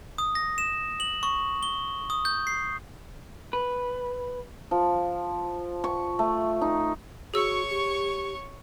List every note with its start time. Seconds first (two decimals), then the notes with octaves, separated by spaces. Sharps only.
0.18 D#6
0.35 A#6
0.58 E7
1.00 F#7
1.23 C#6
1.63 G7
2.10 D#6
2.25 G6
2.47 C7
3.53 B4
4.71 F3
5.84 C#6
6.19 A3
6.61 D#4
7.34 F#4 G#4 C#5 C#6 E6
7.70 G4